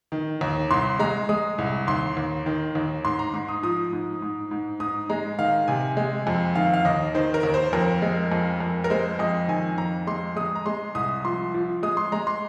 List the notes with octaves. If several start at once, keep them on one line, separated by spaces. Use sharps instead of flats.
D#3
D#2
C2 C6
G#3 A#5
G#3 D#6
C2
D#2 C6
D#2
D#3
D#2
G#2 C6
A#5
G#2 C6
D#6
F3 D#6
G#2
G#2
G#2
G#2 D#6
G#3 A#5
D#3 F5
C3 G#5
G#3
F2
D#3 F5
F5
D#2 D#5
D#3 C5
A#4
D#2
C5
F2 A#4
G#3
F2
F2
A#4
G#3 C5
F2 D#5
D#3 G#5
F2 A#5
G#3 C6
G#3 D#6
A#5
G#3 C6
C2 D#6
F3 C6
F3
G#3 D#6
C6
G#3 A#5
C6